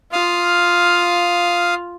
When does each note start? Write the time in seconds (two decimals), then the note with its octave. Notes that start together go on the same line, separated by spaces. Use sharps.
0.13 F4 F5 D#6 F6